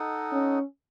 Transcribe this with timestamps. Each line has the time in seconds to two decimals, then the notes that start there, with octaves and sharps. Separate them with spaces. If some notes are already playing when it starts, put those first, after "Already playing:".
Already playing: D#4 A4 D#5 F#5
0.32 C#4